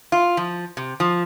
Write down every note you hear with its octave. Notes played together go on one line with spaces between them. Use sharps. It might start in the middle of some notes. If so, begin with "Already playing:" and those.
F4
F3
C3
F3